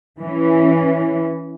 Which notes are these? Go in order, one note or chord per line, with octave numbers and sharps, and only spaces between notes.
E3 C#4